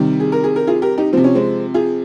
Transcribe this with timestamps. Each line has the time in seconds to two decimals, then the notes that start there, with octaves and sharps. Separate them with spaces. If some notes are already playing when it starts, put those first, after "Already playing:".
Already playing: C3 D#3 G3
0.20 G#4
0.32 A#4
0.44 G#4
0.56 A#4
0.67 F4 G#4
0.82 G4 A#4
0.98 D#4 G4
1.13 C3 F3 C4
1.24 C#4
1.35 G#3 C4
1.74 F4 G#4